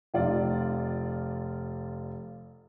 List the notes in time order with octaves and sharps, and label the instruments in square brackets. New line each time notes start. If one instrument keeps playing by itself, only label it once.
[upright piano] F1 F4 D5